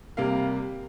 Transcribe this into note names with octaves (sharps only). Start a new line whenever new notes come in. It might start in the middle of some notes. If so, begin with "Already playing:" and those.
C3 G3 A#3 F5